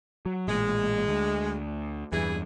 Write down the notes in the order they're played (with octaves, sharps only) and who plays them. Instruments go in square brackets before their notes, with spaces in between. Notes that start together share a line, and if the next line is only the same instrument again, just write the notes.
[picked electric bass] F#3
[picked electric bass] A1 A#2 [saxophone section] G#3
[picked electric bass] D2
[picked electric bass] E2 G2 [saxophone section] E3 G#4